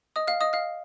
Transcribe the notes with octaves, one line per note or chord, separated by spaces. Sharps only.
D#5 D#6
F5 F6
D#5 D#6
F5 F6